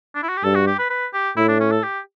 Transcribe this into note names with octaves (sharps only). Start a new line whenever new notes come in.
D4
E4
F#4
G4
G2 A4
F#4
G4
B4
B4
G4
A2 E4
D4
C#4
A4
G4